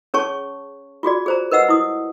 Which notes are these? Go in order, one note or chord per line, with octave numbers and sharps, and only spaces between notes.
C#4 G#4 C#5 A5 C#6
F4 F#4 G#4 D5
G#4 C5 A#5
A#4 B4 D#5 F#5 E6
E4 D#6